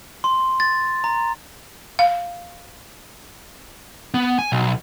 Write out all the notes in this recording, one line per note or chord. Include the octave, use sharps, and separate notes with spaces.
C6
A6
A#5
F5
B3
G#5
B1